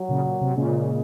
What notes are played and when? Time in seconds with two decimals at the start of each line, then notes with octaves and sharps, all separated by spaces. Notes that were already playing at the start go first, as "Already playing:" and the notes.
Already playing: F#3
0.08 A#2 C#3
0.25 A#2
0.41 C3
0.56 A#2 C#3 G#3